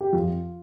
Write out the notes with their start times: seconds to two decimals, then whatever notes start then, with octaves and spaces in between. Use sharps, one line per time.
0.01 G4
0.13 F2 F4